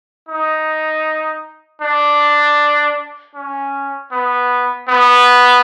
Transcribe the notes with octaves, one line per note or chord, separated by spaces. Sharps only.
D#4
D4
C#4
B3
B3